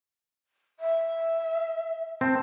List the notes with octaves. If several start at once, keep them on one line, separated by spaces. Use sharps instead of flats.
E5
C4 A5